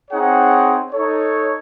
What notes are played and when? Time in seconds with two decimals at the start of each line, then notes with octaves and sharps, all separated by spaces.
0.10 C4 D#4 G#4 C#5 F#5
0.91 D#4 A4 C#5